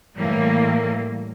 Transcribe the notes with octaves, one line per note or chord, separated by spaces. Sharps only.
A2 E3 G3 A#3